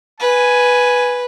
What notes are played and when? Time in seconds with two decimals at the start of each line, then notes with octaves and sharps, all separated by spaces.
0.20 B4 G#5